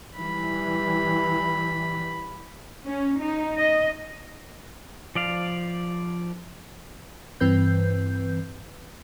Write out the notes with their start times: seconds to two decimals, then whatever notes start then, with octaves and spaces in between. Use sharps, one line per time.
0.17 E3 G3 B5
2.86 C#4
3.20 D#4
3.57 D#5
5.15 F3 D5 F5
7.40 G2 E3 C4 B4 G6